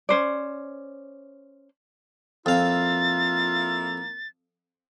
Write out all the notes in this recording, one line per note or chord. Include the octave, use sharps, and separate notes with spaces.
C#4 C5 D5
F2 A#3 E4 F4 F5 A6